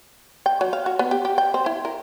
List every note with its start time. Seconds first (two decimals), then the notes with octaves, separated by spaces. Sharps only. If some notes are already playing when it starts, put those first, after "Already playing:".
0.46 G5
0.61 F#3
0.73 F5
0.86 F#4
0.99 B3
1.11 G4
1.25 G4
1.38 G5
1.54 C4
1.66 E4
1.85 A#4